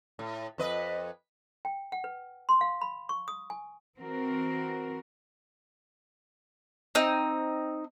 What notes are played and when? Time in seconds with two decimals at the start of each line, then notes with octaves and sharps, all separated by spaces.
0.19 A2
0.58 F2 B4 D#5
1.65 G5
1.92 F#5
2.04 B4
2.49 C6
2.61 F5
2.81 B5
3.09 C#6
3.28 D#6
3.50 G#5
3.97 E3 C4 F#4 A#4
6.95 C4 D#4